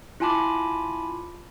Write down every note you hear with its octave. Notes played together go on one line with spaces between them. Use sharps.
E4 F4 G#5 A5 B5 D6